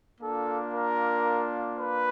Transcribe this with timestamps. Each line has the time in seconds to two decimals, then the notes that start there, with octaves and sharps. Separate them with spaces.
0.21 A#3 D4 F4 A4
0.73 A#4
1.77 B4